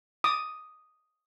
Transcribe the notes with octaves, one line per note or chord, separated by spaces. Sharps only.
D6 D#6